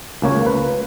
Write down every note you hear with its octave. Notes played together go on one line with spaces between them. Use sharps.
C#2 A#3 C#5
B4